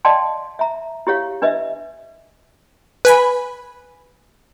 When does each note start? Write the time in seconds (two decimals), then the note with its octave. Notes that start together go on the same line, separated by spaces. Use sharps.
0.05 D5 D#5 F5 G5 A5 C6
0.59 E5 A#5
1.07 E4 G4 C#5 F5
1.42 D4 B4 D#5 E5
3.05 B4 G#5 B5